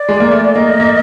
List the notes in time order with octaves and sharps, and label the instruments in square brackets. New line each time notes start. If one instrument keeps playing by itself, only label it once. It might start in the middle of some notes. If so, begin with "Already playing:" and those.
Already playing: [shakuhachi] D5
[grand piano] G#3
A#3
A3
[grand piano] A#3 [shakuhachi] D#5
[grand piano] A3
A#3